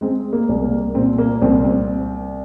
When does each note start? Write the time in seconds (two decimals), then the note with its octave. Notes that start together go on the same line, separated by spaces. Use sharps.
0.01 G#3 C4
0.33 A#3
0.49 C2
0.64 A#3
0.95 A#2 C4
1.18 A#3
1.42 C2 C4
1.65 C4